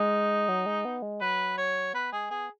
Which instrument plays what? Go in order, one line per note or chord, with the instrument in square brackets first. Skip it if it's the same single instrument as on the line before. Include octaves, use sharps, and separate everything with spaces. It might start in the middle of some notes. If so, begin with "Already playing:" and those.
Already playing: [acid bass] G#3 [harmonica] D#4
[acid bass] F#3
G#3
B3
G#3
[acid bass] F#3 [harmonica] B4
[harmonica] C#5
[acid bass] B3 [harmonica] B4
[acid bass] G#3 [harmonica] G#4
[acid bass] B3 [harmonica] G#4